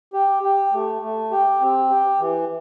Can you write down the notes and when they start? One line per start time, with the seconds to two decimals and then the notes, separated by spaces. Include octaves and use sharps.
0.14 G4
0.43 G4
0.73 A3
1.02 A3
1.32 G4
1.61 C4
1.89 G4
2.19 E3